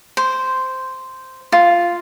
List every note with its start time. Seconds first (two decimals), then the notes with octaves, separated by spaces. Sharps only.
0.17 C5
1.52 F4